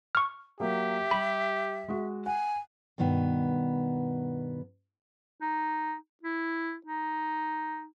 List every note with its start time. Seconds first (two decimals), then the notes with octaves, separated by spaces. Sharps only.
0.15 C#6 F6
0.60 F#3 A#3 G4 E5
1.11 G3 B5
1.88 G#3 F#4
2.26 F#5 G#5
2.98 G2 B2 D#3 B3
5.41 D#4
6.23 E4
6.86 D#4